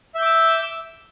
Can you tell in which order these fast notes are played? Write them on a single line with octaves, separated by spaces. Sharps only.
E5 G6 D6 E6